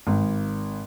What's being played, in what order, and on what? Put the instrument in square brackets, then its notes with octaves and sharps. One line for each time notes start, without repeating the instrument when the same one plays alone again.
[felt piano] G#1